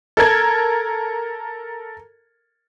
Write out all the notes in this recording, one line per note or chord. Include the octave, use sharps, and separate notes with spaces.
A4 A#4 G#6